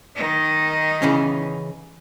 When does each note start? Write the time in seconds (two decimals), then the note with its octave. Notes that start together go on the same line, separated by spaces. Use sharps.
0.16 D#3 D#4
1.02 C#3 E3 C#4